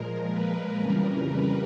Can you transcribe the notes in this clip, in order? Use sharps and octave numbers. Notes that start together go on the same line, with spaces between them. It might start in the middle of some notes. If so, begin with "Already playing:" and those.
Already playing: A#2 F3 G#3 A#4
B4
F2 C#3 E3 G3 A#4
B4